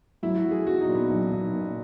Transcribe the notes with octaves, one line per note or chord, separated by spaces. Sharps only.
F#3 E4
F#4
F#3
G#4
B1 F#4
D#4
A#2
B3
B1
B1
A#2